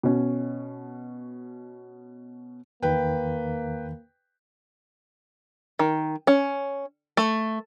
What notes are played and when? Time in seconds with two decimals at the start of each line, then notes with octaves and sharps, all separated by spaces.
0.03 B2 C#4
2.82 E2 D#3 A#3 B4 G5
5.79 D#3
6.27 C#4
7.17 A3